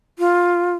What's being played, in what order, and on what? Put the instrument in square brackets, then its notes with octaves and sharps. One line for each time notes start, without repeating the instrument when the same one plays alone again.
[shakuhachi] F4